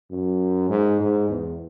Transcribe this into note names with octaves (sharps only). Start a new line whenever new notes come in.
F#2
G#2
G#2
E2